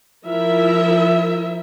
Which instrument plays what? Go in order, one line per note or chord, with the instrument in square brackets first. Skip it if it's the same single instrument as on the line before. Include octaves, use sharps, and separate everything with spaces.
[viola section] F3 E4 A#4 E5